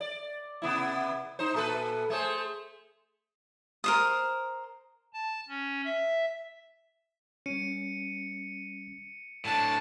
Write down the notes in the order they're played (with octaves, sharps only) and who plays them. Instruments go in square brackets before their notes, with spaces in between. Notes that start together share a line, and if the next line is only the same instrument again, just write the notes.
[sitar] D5
C3 B3 E4
D#4 C5
A#2 A4 B4
A3 G#4 C5
[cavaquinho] A#4 C5 D#6
[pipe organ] A5
C#4
E5
[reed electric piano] G3 C#4 [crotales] C#7 D#7
[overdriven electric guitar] A2 D3 [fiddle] A5